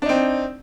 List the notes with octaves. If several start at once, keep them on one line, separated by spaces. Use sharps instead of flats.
C4 D4 D#4